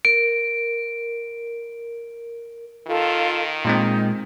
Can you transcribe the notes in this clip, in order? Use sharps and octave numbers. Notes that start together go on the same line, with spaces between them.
A#4 D7
D#3 F4 A4 F5
A#2 G#3 C4 D#4